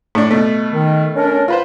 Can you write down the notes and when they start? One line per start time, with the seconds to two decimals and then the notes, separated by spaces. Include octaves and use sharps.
0.15 A2 D4
0.31 B2 A3
0.73 D#3
1.15 C#4 D4 A#4
1.48 F4 B4 C5